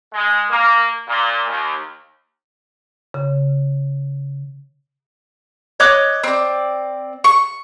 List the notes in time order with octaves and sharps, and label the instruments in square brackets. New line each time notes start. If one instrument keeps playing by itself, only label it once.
[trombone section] G#3
A#3
A#2
D#2
[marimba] C#3
[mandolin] C#5 D#5 D6 F#6
C4 D5
C#6